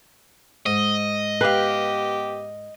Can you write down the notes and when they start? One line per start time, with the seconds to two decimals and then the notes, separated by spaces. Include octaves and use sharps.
0.66 G#2 D#5
1.41 B3 G4 B4 F5